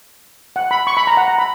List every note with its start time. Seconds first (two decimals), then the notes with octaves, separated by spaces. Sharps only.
0.56 F#5
0.71 B5
0.87 C#6
0.97 B5
1.07 A#5
1.17 F#5
1.28 A#5
1.38 B5